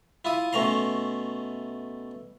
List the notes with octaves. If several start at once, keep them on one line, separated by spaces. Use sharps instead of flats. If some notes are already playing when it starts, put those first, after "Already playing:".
E4 F4 D#6
B2 A3 C#4 A#5 C6